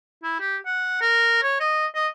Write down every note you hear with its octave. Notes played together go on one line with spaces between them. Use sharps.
E4
G4
F#5
A#4
C#5
D#5
D#5